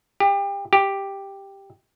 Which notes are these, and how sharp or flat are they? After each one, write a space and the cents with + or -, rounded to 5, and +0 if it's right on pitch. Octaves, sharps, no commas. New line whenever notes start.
G4 +30
G4 +5